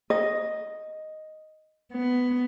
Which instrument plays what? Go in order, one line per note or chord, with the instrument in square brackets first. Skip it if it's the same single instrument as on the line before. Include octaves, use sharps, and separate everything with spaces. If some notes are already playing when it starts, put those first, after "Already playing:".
[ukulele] D#5
[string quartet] B3